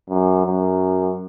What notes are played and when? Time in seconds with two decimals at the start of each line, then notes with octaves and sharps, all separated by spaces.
0.10 F#2
0.46 F#2